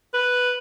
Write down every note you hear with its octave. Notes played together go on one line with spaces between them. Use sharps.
B4